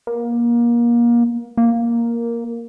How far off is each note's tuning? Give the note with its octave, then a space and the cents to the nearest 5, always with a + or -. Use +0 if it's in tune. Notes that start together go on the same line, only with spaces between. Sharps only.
A#3 +25
A#3 +0